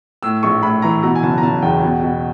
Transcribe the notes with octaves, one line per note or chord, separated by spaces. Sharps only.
A2 E6
A#1 C#6
A2 B5
E3 A#5
B2 A#5
G#5
F#1 A5
A#5
F#1 A5
E2 G5
B2
B2